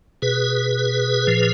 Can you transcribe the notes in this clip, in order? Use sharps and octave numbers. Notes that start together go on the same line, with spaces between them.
B2 G#4 B4
A#2 F3